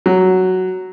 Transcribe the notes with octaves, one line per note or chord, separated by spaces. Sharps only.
F#3